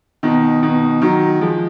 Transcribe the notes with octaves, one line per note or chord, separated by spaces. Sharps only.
B2 D#3
B2 D#3
D#3 F#3
F3 G#3